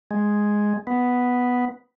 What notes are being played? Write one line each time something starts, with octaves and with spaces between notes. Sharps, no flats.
G#3
B3